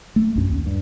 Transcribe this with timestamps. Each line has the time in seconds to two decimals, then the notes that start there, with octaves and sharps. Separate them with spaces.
0.16 A3
0.35 B1 F#2 C#4
0.49 D#2
0.66 G2